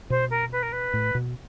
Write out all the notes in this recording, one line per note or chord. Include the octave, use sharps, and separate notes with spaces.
B2 C5
A#4
B4
A#4
B4
A2
B2